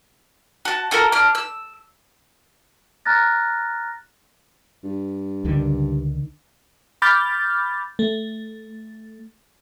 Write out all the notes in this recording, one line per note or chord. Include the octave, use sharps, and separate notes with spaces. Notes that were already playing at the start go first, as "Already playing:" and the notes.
F#4 A5
F4 F#4 A4 A#4
D4 F6
E6
A#5 F6 F#6 A6 A#6
G2
C#2 D3 D#3
B5 D6 F6 G6 A6
A3